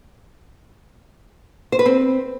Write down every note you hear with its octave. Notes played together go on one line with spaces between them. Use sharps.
C5
B4
C4